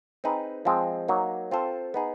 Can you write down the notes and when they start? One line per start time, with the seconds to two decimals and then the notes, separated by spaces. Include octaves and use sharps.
0.24 C4 D#4 G#4 B4
0.65 F3 G#3 C4
1.08 F#3 A#3 D#4
1.51 C4 F4 A4 C5
1.94 B3 D#4 G#4